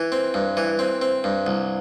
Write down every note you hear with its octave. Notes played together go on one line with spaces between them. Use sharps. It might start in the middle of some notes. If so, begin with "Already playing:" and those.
Already playing: E3
C4
G2
E3
C4
C4
G2
C2